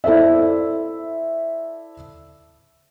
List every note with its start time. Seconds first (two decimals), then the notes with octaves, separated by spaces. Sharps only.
0.04 E4 A4 C5 D5 E5